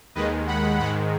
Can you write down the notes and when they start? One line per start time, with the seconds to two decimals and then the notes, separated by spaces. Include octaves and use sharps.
0.15 D#2 D#3 G#3 B4 D#5
0.47 F#5 B5
0.79 G#2 D#3 G#3 F#5 B5